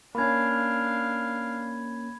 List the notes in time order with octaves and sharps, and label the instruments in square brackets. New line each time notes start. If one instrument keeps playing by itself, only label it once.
[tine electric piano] A#3 C#4 [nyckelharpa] D4 F5 [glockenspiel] B5 G#6